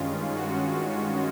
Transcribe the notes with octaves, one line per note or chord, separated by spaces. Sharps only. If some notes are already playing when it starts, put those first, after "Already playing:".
Already playing: G2 D#3 G#3 C#4 F4
F#4